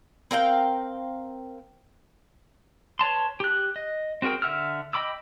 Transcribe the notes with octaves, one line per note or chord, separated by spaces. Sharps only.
C4 A#4 F5 G5
B4 C#5 A5 C6
G4 F#6
D#5
C4 F#4 G#4 A#4 G5
D3 E5 F#5 E6 F6
D#5 G5 B5 D6 E6